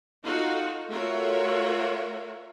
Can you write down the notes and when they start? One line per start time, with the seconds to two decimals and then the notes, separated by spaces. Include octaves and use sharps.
0.25 D#4 F4 F#4 A4
0.90 A3 F4 F#4 A#4 C#5 E5